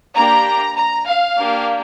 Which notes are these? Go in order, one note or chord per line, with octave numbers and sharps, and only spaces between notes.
A#3 D4 G4 A#5
A#5
F5
A#3 D4 G4